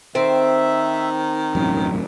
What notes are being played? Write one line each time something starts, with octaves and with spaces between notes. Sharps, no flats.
D#3 C4 E5
E1 A1 F#2 A2